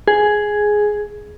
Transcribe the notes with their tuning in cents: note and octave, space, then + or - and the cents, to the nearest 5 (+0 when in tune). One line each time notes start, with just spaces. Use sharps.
G#4 +5